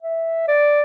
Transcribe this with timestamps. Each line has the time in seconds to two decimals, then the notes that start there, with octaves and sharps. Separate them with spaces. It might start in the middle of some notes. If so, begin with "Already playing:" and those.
0.03 E5
0.48 D5